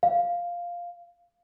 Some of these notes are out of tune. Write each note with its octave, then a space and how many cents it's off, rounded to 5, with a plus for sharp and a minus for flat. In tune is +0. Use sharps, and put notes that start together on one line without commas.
F5 +0